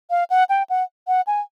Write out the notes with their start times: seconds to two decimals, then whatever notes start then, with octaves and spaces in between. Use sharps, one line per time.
0.10 F5
0.30 F#5
0.49 G5
0.70 F#5
1.08 F#5
1.27 G#5